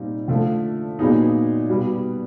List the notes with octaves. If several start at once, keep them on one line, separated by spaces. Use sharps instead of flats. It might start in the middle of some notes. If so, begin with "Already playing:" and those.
Already playing: A#2 G3 C4 D#4
D3 F3 A3
A#2 F#3 B3 D#4 G#4
B2 G3 B3